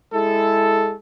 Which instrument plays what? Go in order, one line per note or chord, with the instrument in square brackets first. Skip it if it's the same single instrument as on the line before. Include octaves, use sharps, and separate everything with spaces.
[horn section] G#3 E4 G#4 A4